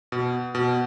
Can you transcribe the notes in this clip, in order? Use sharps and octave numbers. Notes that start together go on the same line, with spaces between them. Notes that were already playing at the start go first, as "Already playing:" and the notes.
B2
B2